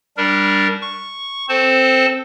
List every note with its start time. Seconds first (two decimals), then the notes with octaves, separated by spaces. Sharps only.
0.17 G3 D4 A#4
0.81 C#6
1.49 C4 A4 C5 A5